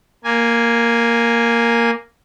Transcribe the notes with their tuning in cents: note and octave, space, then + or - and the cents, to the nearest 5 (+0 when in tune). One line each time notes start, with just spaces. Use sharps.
A#3 +0 G#5 +0